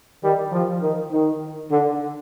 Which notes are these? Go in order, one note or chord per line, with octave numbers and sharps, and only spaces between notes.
D#3 G3
F3
D#3
D#3
D3